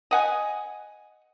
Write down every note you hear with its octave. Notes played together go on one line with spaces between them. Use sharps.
D#5 F#5 G#5